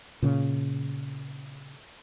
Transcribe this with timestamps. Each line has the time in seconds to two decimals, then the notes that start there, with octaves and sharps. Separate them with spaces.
0.22 A#2 C#3